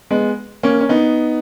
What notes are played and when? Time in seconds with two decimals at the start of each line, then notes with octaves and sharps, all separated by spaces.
0.11 G#3 B3
0.63 A#3 C#4
0.81 C#4
0.89 B3 D#4